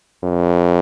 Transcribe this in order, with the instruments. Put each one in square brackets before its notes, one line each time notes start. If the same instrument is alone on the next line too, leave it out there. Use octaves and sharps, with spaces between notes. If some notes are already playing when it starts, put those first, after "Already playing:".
[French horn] F2